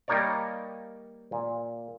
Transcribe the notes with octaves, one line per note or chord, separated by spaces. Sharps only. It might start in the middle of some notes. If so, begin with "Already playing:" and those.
G3 A#3 D#4 A#4 C#5 D5
A#2